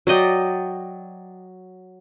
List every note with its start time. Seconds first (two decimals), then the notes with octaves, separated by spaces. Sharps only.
0.07 F#3 D5 D#5 G5